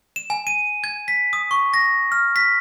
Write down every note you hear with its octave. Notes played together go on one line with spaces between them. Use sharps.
E7
G#5
D#7
G#6
B6
D#6
C#6
A#6
F6
B6